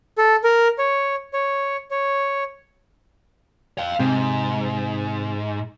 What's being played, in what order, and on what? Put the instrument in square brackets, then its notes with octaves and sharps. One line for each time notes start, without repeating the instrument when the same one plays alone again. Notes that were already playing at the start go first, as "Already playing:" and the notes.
[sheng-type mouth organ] A4
A#4
C#5
C#5
C#5
[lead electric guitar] F5 G5
[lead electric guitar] G#2 [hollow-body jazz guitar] C3